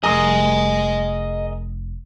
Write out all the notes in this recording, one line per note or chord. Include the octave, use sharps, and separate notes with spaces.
F1 G#4 A#4 D#5 C6 D#6